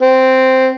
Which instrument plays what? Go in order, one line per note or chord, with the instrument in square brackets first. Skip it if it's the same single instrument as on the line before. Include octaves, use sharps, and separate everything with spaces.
[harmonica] C4